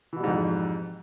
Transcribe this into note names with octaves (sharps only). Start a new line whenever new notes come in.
F2 G#2 B2 E3 G3